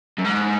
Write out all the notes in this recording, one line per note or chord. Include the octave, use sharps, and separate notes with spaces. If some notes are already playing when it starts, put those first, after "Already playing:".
F#2
G#2